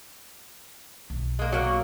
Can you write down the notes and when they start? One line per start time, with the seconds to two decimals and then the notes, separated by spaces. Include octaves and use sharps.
1.10 B1
1.39 G#3 A#3
1.52 F#3 A#3